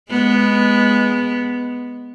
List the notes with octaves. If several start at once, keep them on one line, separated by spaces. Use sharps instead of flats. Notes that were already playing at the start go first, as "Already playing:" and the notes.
G#3 B3